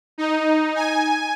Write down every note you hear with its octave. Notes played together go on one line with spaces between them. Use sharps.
D#4
G#5